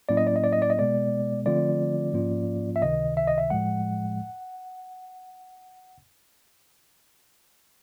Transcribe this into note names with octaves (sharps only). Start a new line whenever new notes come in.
A2 F#3 A#3 C#4 E4 D5
D#5
D5
D#5
D5
D#5
D5
D#5
B2 G#3 B3 D5
D3 F3 A3 C4 F4 D5
G#2 F3 A#3 C#4 F4
E5
C#2 C3 D#3 D#5
E5
D#5
E5
A2 F3 G#3 F#5